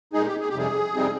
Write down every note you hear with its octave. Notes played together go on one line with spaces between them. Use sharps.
A#2 G#3 D#4 G#4
G4
G#4
G4
F2 C3 G3 G#4
F2 C3 G3 C4 D#4